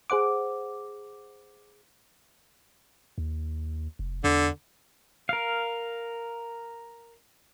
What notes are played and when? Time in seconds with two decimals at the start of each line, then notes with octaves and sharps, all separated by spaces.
0.10 G#4 C5 F#5 D6
3.18 D#2
3.99 F1
4.24 E2 D3
5.29 A#4 F5